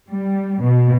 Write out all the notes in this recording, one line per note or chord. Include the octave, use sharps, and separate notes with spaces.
G3
B2